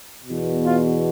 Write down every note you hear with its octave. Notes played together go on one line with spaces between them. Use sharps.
E2 B2
F4